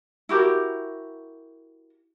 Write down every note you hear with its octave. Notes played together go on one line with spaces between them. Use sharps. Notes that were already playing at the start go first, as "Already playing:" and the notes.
E4 F#4 G4 A#4